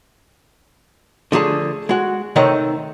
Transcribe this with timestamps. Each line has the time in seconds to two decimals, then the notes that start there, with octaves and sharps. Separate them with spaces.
1.32 D3 F3 A3 G#4 A5
1.89 G#3 F#4
2.36 C3 D#3 A3 C4 C#5 D#5